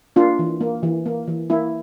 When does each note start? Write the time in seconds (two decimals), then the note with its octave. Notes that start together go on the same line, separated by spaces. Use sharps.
0.16 A#3 D4 F4
0.39 E3
0.61 A#3
0.83 E3
1.06 A#3
1.28 E3
1.50 A#3 E4